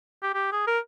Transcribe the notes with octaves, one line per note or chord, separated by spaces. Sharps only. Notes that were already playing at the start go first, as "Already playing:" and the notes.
G4
G4
G#4
A#4